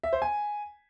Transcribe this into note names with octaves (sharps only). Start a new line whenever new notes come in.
E5
C5
G#5